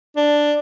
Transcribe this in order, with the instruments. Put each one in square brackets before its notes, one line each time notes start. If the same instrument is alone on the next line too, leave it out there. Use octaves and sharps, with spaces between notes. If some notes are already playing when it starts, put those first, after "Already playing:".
[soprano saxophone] D4